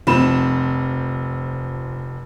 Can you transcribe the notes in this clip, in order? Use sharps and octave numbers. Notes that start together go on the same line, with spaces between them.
F1 F3 C4 B5 E7